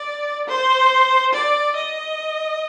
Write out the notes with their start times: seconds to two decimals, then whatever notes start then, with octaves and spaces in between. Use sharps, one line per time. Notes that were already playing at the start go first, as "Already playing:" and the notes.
Already playing: D5
0.48 C5
1.33 D5
1.76 D#5